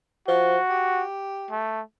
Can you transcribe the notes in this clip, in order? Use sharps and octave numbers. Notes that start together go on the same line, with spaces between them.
F3 F#4
G4
A3